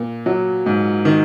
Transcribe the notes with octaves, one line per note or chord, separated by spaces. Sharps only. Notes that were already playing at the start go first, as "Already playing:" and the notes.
Already playing: A#2
F#3
G#2
D#3